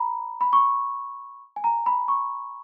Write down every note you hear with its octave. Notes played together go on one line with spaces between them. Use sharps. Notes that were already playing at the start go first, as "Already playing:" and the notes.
Already playing: A#5 B5
B5
C#6
G#5
A#5
B5
C#6